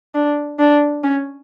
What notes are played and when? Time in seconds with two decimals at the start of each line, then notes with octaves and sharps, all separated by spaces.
0.15 D4
0.59 D4
1.03 C#4